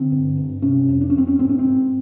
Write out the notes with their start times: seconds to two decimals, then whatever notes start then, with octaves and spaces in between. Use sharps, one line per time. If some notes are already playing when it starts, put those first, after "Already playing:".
Already playing: D3 C4
0.12 G2
0.37 G2
0.62 C3 C#4
0.89 F2
1.01 D4
1.10 C#4
1.14 F2 C4
1.27 C#4
1.39 G#2 C4
1.49 C#4
1.59 C4
1.65 G#2